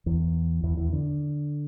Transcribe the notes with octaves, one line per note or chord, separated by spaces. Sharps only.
E2 E3
E2 E3
E2 E3
D3